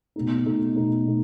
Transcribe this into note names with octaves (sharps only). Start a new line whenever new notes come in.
B2 A3 D#4
B2 A3 D#4
B2 A3 D#4
B2 A3 D#4